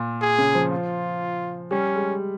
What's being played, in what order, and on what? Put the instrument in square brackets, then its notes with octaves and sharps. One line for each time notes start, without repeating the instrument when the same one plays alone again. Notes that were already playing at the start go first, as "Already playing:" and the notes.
Already playing: [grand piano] A#2
[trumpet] G#4
[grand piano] C#3
F3
[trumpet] F4
[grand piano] G3 [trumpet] C#4
[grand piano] G#3